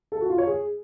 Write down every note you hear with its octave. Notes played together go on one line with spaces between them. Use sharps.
A4
F#4
F4
C#5
G#4